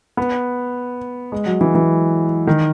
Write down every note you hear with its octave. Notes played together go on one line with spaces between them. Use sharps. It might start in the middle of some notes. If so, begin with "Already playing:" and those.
B3
G#3
F#3
E3
E3
D#3